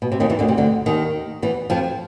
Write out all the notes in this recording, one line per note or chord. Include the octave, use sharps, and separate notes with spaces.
B2
C3
D#2 D#3
E2 E3
D2 D3
C3
D2 D3
D#2 D#3
E2 E3
F2 F3